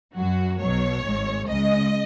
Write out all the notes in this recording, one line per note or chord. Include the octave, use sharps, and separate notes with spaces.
F#2 F#3 F#4
B1 B2 F#3 C#5
G#1 G#2 G#3
C#2 C#3 G#3 D#5